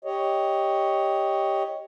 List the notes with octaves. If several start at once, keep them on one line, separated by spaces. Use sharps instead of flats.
G4 C#5 D#5